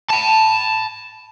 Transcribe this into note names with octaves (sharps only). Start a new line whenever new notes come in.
A5 B5